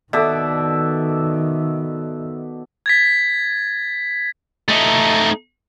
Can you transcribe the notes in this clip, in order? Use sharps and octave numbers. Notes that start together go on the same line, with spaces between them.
B2 D#3 A4 D5 E5
G#6 A6 B6
A3 D#4